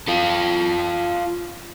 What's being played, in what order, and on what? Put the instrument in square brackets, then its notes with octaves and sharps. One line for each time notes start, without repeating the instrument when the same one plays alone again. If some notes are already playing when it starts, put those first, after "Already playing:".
[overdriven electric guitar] F4 A4